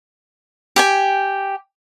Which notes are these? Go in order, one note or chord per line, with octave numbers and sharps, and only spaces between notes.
G4 G5 G#5